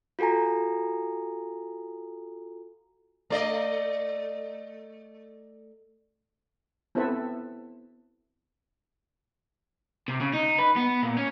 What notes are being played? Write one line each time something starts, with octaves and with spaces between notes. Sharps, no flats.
F4 F#4 A4 G#5 A#5
A3 D5 D#5
B3 C4 E4 A4 B4 E5
C3
C#3
D#4
B4
B3
A#2
C#4